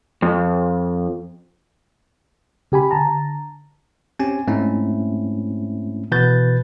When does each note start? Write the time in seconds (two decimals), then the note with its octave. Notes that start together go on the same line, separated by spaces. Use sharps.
0.22 F2
2.72 C#3 G4 G#5 B5
2.91 D3 A5 A#5
4.19 C4 C#4 G4 G#5
4.47 G#2 A3 C4 C#4 E4
6.12 B2 E3 B4 G6 A6